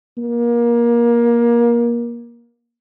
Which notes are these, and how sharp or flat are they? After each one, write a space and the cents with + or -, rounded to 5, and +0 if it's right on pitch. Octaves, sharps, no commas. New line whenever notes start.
A#3 +25